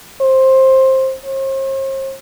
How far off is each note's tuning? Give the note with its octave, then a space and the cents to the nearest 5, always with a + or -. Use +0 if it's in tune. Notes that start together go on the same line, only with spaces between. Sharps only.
C5 +15
C5 +45